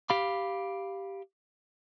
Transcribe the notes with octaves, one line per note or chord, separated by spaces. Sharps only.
G4 F5 B5